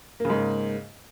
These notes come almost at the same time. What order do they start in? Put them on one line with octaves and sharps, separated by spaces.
A#3 C#3 G#2